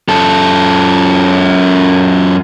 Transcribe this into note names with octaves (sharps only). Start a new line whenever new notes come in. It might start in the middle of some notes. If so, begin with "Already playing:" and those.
F#2 A4